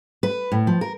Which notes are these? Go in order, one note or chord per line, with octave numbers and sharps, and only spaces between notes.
B4
A2
F3
A#4